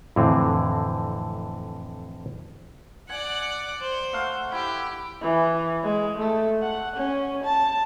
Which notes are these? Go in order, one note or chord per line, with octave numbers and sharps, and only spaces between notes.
F2 A2 D3 E3 C4
D5 F#5 G#5
C5
A3 F5 F#5
E4 G4
E3
G#3
A3
F#5
C#4
A5